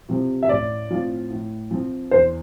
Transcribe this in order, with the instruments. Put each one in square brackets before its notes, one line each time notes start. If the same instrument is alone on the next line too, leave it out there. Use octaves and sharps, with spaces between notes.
[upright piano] C3 F3 C4
[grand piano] E5
[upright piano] A1 [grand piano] D5
[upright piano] A2 F3 C4 F4
A2
F3 C4
[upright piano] E2 [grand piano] C5